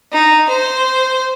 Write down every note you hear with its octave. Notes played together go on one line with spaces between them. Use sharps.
D#4
C5